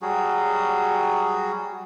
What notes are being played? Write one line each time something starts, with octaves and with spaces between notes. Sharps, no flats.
F#3 G3 F#4 G#4